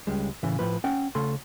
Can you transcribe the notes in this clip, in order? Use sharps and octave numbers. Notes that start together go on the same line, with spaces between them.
C#2 G3 G#3
A2 C#3 E3
A2 F3 B4
C#4 F#5 G5
C#3 A3 A4 C6